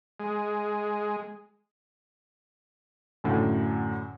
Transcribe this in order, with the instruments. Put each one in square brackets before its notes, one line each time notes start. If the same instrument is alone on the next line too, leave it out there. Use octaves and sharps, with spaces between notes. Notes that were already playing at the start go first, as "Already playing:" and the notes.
[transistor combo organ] G#3
[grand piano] F#2 A2 D3